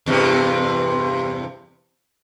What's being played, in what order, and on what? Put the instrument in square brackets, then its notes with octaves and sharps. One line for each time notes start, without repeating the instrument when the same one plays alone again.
[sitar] E2 G2 C3